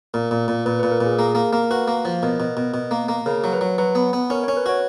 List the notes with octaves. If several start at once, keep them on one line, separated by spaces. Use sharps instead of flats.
A#2 A#4
A#2
A#2
A#2 B4
A#2 B4
A#4
A#2
G#4
A#3 G#4
A#3 A#4
A#3 A#4
F#4 B4
A#3
F3
B2 A#4
B2
B2
B2
A#3
A#3
C#3 A#4
F#3
B4
F#3
F#3 B4
B3
B3
C#4 A#4
C#5
C#4
B4
F#4 C#5